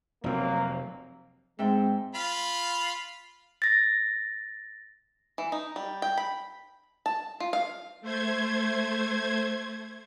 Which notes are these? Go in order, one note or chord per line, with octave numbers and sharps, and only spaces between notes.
F1 F#3 A#3 C4
G#2 G#3 C4 E5 G5
F4 F5 B5
A6 A#6
E3
D#4
G3
G5
B5
A5
F4
F5
A3 C5 G#6